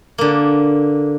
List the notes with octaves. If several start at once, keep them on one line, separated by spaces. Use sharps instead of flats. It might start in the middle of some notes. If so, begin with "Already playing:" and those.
D3 A#3